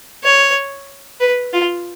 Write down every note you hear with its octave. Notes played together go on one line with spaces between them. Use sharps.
C#5
B4
F4